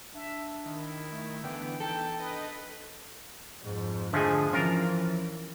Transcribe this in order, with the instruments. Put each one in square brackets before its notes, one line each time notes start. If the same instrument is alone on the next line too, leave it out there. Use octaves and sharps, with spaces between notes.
[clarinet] D4 [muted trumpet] E5
[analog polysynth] D#3 [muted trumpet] E4
[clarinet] A3
[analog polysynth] D3 E3 B3 [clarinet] G5
[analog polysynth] E3 [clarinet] D#4 [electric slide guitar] A4 [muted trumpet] G5
[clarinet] D4 [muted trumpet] B4 [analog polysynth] D#5
[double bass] F2 G#2
[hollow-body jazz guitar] D3 G#4 [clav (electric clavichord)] F3 G#3 A3
[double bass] E3 [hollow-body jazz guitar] F3 C#4 [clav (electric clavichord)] F4 A#4